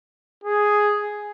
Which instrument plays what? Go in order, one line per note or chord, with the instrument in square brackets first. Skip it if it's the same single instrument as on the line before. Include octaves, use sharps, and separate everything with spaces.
[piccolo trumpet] G#4